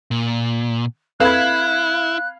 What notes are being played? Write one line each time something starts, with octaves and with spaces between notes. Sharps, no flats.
A#2
C4 E4 A4 B4 F5 B5 F#6 G#6